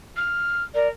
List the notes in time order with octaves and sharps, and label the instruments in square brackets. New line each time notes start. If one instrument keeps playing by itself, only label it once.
[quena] F6
[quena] A#4 [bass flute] D5